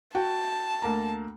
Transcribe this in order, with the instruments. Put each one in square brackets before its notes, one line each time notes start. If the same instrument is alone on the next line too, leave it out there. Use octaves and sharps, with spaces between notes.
[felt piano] F#4 G5 [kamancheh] A5
[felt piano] D2 A#3 A#5